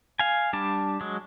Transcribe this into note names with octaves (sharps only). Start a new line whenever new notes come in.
F5 G#5
G3 D4 A5
F#3 G#3